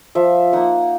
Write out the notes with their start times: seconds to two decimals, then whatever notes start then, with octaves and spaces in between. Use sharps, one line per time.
0.15 F3 E5
0.53 A#3 D#4 F#5